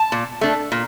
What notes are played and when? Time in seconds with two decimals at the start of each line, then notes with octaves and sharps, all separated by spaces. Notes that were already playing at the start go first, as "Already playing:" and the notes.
Already playing: A5
0.12 A#2
0.41 A3 D4
0.72 A#2